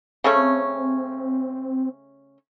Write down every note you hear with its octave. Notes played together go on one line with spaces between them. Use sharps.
C#3 A3 C4 C#4